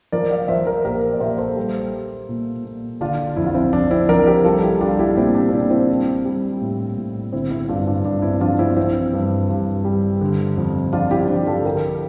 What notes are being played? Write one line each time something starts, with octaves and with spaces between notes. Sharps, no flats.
F3 A#4 D5
D5 F5
F3 C5 E5
A#4 D5
A#2 G4 A#4
D5
A#2 C5 E5
A4 C5
G3
G3
A#2
A#2
D3 D4 F4
F2 E4
F4
C4 E4
F2 D4
C4 E4
F3 A#4 D5
G4 A#4
G3 F4 A4
E4 G4
G3 D4 F4
E4 G4
A#2 C4 E4
D4
C4
A#2 D4
C4 E4
G3
G3
A2
A2
D3 C4 E4
C4 E4
G2 D4 F4
D4 F4
G2 D4
C4 E4
F3 D4 F4
C4 E4
F4
E3 C4 E4
G2
G2
G3
D3
F2
F2 D4 F4
E4 G4
F3 D4 F4
F4 A4
D3 G4 A#4